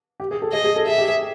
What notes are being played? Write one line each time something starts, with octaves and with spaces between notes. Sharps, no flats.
G4
G#4
A4
G#4 D#5
G#4
A4
G#4 E5
G4
G#4